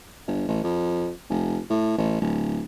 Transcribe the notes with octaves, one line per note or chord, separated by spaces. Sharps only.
G1
A1
F2
F1
A2
A1
D1